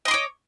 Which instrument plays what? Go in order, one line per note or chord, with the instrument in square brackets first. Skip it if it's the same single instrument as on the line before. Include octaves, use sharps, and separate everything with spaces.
[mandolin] D#5
C6
D6
C#5